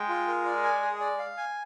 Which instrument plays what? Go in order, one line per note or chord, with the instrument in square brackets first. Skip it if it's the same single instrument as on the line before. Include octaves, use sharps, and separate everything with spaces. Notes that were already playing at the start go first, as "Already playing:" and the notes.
Already playing: [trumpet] G#3 [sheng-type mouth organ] G5
[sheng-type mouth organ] F4
A#4
D5
G#5
G#4
D5
F5
G#5